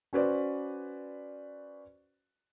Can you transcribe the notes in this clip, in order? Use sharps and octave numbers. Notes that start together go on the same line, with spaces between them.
C#4 F#4 B4 C5 D5